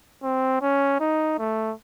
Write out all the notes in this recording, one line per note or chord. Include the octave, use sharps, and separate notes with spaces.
C4
C#4
D#4
A3